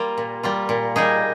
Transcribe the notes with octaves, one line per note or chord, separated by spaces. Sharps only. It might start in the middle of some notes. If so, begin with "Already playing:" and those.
Already playing: G3 A#3 F4
A#2
G3 A#3 F4
A#2
G3 A#3 D#4 G#4